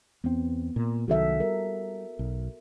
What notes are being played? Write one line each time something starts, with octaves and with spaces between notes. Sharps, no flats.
E2 B3 C4
A#2
C2 D#3 F#3 F#4 A4 E5
G3 A#4
B1